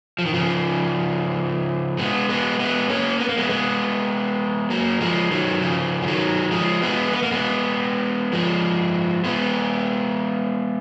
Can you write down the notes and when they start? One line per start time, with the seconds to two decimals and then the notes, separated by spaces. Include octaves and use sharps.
0.19 F3
0.25 D#3
0.34 C#3 F3
1.99 G#3 B3
2.30 G#3 B3
2.59 G#3 B3
2.89 A#3 C#4
3.20 B3
3.29 A#3
3.37 G#3 B3
3.50 G#3 B3
4.70 F#3 A#3
5.01 F3 G#3
5.31 D#3 F#3
5.62 C#3 F3
6.02 F3
6.07 D#3 F#3
6.51 F3 G#3
6.82 G#3 B3
7.12 B3
7.23 A#3
7.32 G#3 B3
8.33 F3 G#3
9.24 G#3 B3